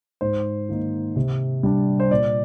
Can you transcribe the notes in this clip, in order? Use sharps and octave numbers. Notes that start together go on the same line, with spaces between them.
G#2 C5
D#3 A#3 D#4
C3
G3 D4
C5
A#2 D5